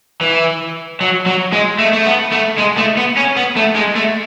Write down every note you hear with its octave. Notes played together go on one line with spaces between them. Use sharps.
E3
F#3
F#3
G#3
A3
A3
B3
A3
G#3
A3
B3
C#4
B3
A3
G#3
A3